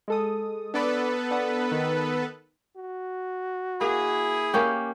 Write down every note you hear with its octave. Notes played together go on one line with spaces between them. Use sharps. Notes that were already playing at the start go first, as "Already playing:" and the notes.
G#3 A4 D#6
B3 D4 A4 B4 D5
D4 F#5
D#3
F#4
A#3 E4 G#4
A#3 C#4 G4